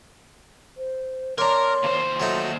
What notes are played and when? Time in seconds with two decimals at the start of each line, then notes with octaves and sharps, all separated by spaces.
0.77 C5
1.38 A#3 D4 A#4 C#5 A#5 C6
1.83 D#2 C5
2.20 F#3 A3 D#4 F#4